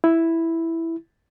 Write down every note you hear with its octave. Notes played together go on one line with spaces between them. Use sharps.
E4